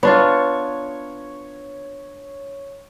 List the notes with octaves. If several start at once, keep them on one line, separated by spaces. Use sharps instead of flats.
B3 D4 F4 C#5